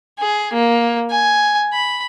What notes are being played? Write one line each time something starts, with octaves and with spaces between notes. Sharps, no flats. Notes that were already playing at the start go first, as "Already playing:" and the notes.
G#4
A#3
G#5
B5